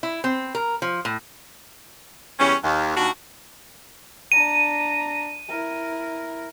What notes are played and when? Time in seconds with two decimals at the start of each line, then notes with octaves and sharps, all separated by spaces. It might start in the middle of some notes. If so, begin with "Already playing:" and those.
0.03 E4
0.24 C4
0.55 A#4
0.82 F3
1.05 A2
2.39 E2 G3 C#4
2.62 D#2
2.96 D#2 D4 F#4
4.32 D4 A#5 D#7
5.50 E4 A#4